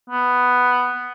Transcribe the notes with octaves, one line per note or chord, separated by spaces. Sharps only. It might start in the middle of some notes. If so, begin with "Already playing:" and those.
B3